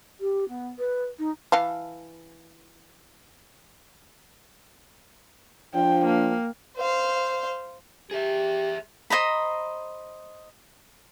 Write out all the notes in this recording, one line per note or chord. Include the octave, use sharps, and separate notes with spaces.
G4
B3
B4
D#4
E3 F5 A5
F3 D4 G5
A#3
C5 F5
G4 G#4 E5
C5 D#5 A#5 B5